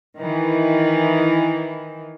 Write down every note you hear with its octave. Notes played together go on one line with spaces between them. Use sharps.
D#3 E3